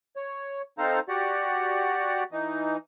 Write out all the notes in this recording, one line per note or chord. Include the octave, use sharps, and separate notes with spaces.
C#5
C4 D#4 A4 C5 F5 A#5
F#4 G4 D5 F#5
E3 D#4